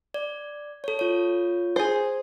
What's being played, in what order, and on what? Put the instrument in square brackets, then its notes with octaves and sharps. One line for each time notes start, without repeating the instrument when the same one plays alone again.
[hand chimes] D5
A4 C#5
F4 C#5
[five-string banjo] G#4 C5